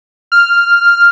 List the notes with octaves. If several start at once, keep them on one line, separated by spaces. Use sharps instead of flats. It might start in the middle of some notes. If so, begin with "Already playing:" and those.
F6